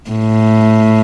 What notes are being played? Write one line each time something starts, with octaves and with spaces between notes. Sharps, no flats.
A2